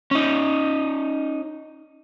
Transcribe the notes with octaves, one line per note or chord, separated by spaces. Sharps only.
C#4 D#4